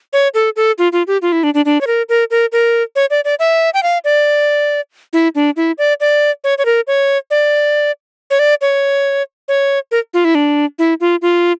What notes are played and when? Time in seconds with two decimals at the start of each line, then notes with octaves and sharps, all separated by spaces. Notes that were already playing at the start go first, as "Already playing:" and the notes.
0.13 C#5
0.34 A4
0.56 A4
0.78 F4
0.92 F4
1.07 G4
1.22 F4
1.32 E4
1.43 D4
1.54 D4
1.65 D4
1.81 C#5
1.87 A#4
2.09 A#4
2.31 A#4
2.52 A#4
2.96 C#5
3.10 D5
3.25 D5
3.39 E5
3.74 G5
3.83 F5
4.05 D5
5.13 E4
5.35 D4
5.56 E4
5.78 D5
6.00 D5
6.44 C#5
6.58 C#5
6.65 A#4
6.87 C#5
7.31 D5
8.30 C#5
8.39 D5
8.61 C#5
9.48 C#5
9.91 A#4
10.14 F4
10.25 E4
10.35 D4
10.79 E4
11.01 F4
11.22 F4